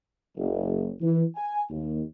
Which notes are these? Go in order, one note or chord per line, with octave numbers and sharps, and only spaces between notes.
F#1
E3
G#5
D#2